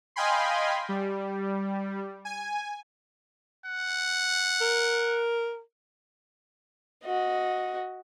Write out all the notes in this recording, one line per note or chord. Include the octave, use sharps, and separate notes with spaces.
D#5 F5 G5 G#5 B5 C6
G3
G#5
F#5
A#4
F#4 D#5